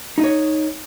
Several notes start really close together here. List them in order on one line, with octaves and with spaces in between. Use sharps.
D#4 D#5 C#5